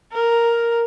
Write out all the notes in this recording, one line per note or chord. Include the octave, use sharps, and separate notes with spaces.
A#4